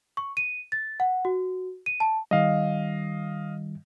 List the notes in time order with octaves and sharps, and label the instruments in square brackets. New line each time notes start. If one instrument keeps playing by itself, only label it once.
[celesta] C#6
D#7
A6
F#5
F#4
D#7
A5
[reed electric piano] D#3 G3 [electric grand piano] D#5 F5